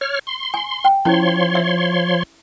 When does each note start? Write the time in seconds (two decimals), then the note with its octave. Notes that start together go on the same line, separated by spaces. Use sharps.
0.01 C#5 F6
0.27 C6
0.54 G#5
0.85 G5
1.05 F3 C#4 E4 C#5 A5 C6
1.55 E5